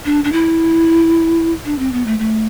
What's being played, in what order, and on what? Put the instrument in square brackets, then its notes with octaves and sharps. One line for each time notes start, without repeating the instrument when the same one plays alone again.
[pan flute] D4
D4
E4
D4
C4
B3
A3
A3